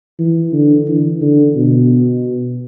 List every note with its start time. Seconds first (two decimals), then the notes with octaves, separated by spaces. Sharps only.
0.19 E3
0.53 D3
0.88 E3
1.21 D3
1.56 B2